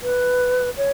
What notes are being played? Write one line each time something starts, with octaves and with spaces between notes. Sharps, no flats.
B4
C#5